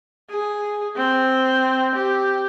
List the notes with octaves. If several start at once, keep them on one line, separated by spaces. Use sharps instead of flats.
G#4
C4
G4